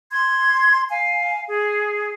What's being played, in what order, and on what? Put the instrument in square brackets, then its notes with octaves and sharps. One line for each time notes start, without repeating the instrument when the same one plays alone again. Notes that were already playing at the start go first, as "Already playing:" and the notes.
[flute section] C6 G#6
F5 G#5
G#4